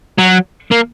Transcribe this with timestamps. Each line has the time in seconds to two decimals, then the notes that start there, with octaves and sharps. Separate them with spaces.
0.18 F#3
0.71 A#3